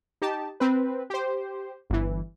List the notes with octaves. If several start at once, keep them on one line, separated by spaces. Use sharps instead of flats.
D#4 G4 A5
C4 B4
G4 C5
G1 E3